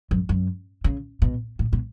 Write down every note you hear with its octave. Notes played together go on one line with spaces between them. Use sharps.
F#2
F#2
C#3
B2
A2
B2